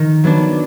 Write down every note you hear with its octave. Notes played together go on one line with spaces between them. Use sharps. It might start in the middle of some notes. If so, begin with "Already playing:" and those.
Already playing: D#3
F#3 B3 D4